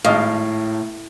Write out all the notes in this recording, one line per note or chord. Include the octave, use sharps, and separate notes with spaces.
G#1 A2 D#5 F5